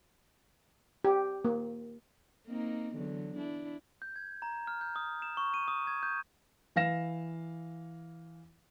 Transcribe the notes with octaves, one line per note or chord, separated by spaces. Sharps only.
G4
A#3
A#3 C4 D#4
E2 D3 F#3
D4 E4
G6
G#6
A#5
F6
G6
D#6
E7
C#6
D#7
D#6
G#6
G6
E3 F5 A#6 E7